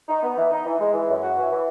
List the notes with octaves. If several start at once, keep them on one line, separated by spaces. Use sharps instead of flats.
D#4
B3
E3
D#4
E3
G#3
E3
F#2
F#4
E3
E3